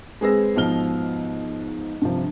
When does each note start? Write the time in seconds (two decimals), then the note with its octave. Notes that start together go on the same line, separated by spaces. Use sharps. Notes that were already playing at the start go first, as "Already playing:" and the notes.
0.21 G#3 C4 G#4 B4 E6 A#6
0.56 G#2 B2 F3 F6 G7
2.02 G2 C3 F3